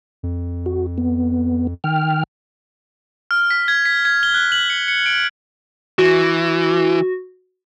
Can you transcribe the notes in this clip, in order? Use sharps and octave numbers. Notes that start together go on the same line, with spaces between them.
F2
F#4
B3
D#3 G5 F6
F6
B6
G#6
B6
G#6
G7
F#6
F#7
C#7
C#7
D7
E3 F#4